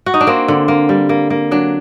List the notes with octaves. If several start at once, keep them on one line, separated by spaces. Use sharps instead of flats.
F#4
D#4
D4
A#3 C4
D3
A#3
G3
A#3
A#3
F#3 D4